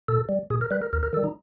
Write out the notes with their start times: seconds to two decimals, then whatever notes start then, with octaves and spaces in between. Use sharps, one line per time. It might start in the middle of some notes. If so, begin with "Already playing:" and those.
0.08 A#2 A4
0.29 G3
0.50 A#2 G#4
0.61 A#4
0.71 G3 B4
0.82 A#4
0.93 D#2 A#4
1.03 A#4
1.13 D#3 A4
1.17 G3
1.24 D#4